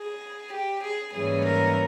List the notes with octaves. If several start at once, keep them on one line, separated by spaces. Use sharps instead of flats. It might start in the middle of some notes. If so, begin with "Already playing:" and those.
Already playing: G#4
G4
G#4
G#2 E3 G3 A#3 C#4 G#4
A#4